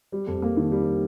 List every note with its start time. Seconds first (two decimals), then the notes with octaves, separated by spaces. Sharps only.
0.12 G3
0.27 F2
0.42 A#3
0.57 D#3
0.72 G3